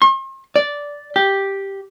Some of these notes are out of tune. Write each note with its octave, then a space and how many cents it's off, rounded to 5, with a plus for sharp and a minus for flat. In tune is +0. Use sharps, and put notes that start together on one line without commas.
C6 +45
D5 -10
G4 +0